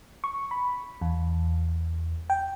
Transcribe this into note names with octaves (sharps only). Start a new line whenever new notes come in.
C#6
B5
E2
G5